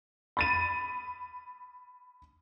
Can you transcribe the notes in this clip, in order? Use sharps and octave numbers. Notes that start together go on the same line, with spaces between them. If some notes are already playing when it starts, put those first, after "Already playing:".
B5 A6 D#7